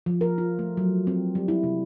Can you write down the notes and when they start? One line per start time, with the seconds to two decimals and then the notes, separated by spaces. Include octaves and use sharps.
0.06 F3
0.21 A#4
0.38 F4
0.59 A3
0.77 F#3
1.07 C4
1.35 G3
1.48 E4
1.63 C3